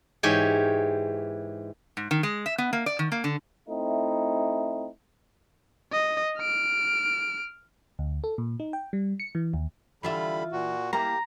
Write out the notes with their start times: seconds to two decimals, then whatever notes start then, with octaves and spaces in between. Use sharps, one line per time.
0.23 G#2 E3 G4 C#5
1.97 G#2
2.11 D#3
2.23 G#3
2.46 E5
2.58 B3
2.73 A#3
2.86 D5
2.99 D#3
3.12 A#3
3.24 D3
3.67 A3 C4 D#4 E4
5.92 D#5
6.38 F6 D7
7.99 D2
8.24 A4
8.38 A#2
8.60 D#4
8.73 G5
8.93 G3
9.20 C#7
9.35 E3
9.54 D#2
10.03 D3 E3 G3 F4 E5 B5
10.52 A#2 F#4
10.93 A#3 E4 G4 A#5